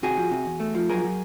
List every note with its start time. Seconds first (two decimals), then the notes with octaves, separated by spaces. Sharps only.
0.03 C3 F#4 G#4
0.17 F3
0.31 C3
0.46 E2
0.60 A3
0.75 F3
0.90 F#3 G#4 A#4
1.04 F#3